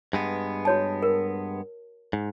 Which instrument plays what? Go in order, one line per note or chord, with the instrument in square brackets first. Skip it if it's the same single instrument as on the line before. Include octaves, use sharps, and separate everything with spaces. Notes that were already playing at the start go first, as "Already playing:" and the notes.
[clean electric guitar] G2 G#3 B3
[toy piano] F#4 C#5 A5
A#4
[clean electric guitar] G#2